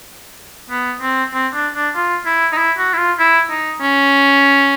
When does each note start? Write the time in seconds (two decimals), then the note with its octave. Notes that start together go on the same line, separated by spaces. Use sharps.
0.70 B3
1.02 C4
1.33 C4
1.54 D4
1.75 D4
1.96 F4
2.26 E4
2.53 D#4
2.57 E4
2.78 F#4
2.93 E4
2.98 F4
3.19 E4
3.50 D#4
3.81 C#4